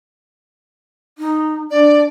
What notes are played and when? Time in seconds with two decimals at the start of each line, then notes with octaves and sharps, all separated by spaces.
1.18 D#4
1.71 D4 D5